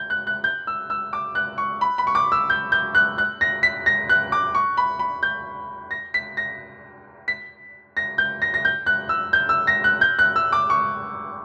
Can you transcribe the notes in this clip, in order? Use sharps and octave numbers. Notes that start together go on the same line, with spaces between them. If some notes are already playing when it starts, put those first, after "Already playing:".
Already playing: G6
F#6
F#6
G6
E6
E6
D6
F#6
C#6
B5
B5
C#6
D6
E6
G6
G6
F#6
F#6
A#6
B6
A#6
F#6
D6
C#6
B5
B5
G6
A#6
B6
A#6
B6
A#6
G6
A#6
A#6
G6
F#6
E6
G6
E6
A#6
F#6
G6
F#6
E6
D6
C#6